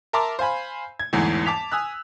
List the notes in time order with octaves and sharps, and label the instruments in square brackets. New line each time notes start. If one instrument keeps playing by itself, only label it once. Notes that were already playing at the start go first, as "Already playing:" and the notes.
[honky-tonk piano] A#4 E5 A5 A#5 C6 D6
C5 F5 G#5 B5
G#6
G1 E2 G#2 E3 A3
A5 D6 B6 F7
G#5 D#6 E6 F#6